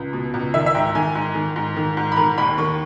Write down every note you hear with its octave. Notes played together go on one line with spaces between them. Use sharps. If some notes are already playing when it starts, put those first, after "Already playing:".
Already playing: C#2
B2
C#2
D#3 E5
E5
G#2 G5
D#3 G#5
G#2
D#3
G#2
D#3
G#2
B5
D#3 A#5
D#2 B5
D#3 C#6